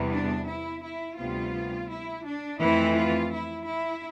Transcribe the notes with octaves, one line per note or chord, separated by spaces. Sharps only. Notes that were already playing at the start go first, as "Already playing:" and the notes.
Already playing: E2 C3 E3 G3 B3
D4
E4
E4
D2 C3 G3 B3 F4
E4
D4
F2 E3 A3 C4 E4
F4
E4
E4